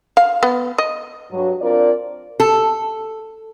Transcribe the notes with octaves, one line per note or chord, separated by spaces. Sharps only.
F5
B3
D#5
G2 F#3
C4 D4 F4 A#4 D5
A4